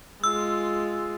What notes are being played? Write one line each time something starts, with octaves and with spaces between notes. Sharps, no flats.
G#3 F4 E6